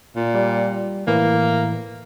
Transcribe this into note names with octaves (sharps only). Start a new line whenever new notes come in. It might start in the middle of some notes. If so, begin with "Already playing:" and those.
A#2
G3
A2 E3 A#3